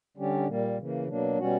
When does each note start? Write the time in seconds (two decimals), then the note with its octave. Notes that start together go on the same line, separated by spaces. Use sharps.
0.17 D3 G3 C#4 G4
0.47 A#2 G3 A#3
0.78 C#3 E3 A#3
1.08 B2 F#3 A#3 D4
1.38 B2 G3 C#4 F#4